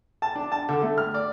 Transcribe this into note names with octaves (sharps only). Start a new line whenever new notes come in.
A5
D4
A5
D3
A3
F6
D5